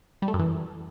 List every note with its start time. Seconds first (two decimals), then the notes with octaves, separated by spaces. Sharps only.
0.22 G3
0.28 A3
0.34 F#2
0.40 E3